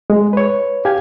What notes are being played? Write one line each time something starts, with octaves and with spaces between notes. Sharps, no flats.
G#3
B4 C#5
G4 F5 G#5 G#6